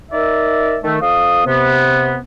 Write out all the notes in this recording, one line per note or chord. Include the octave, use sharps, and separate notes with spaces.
D#4 A#4 D5 E5
D#3 A3
F2 F5 D#6
C3 B3